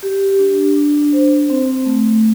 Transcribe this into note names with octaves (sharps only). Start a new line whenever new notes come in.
G4
D4
D4
C5
C4
A3